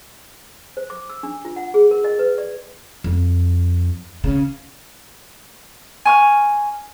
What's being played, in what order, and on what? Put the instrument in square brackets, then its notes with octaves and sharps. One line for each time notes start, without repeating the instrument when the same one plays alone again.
[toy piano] C5
D6
E6
D4
F4
F#5
G#4
A#4
D#5
B4
D5
[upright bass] F2
C#3
[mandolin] G#5 C#6 F6